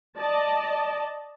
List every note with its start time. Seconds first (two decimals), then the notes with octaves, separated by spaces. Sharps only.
0.17 D5 D#5 A5